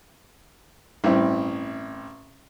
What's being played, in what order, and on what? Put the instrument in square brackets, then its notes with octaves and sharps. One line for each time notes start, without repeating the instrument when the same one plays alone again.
[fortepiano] A1 G2 C4 E4